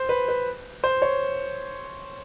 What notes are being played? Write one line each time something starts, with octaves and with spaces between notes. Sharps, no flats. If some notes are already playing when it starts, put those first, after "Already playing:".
Already playing: C5
B4
B4
C5
C#5